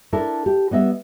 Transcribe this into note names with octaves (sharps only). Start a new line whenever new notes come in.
D4 E4 A4 A#4
G4
G3 B3 D#5 E5